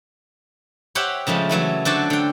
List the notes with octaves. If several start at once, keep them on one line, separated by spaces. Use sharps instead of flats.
G4 C5 C#5 E5 F#5 G5
C#3 F3 G#3 A3
E3 F#3 A3 E4
D3 F#4 A4 C5 D5 A5
D3 G5